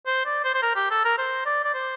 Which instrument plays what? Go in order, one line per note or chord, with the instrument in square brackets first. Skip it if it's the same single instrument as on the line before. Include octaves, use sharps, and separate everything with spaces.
[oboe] C5
D5
C5
C5
A#4
G4
A4
A#4
C5
D5
D5
C5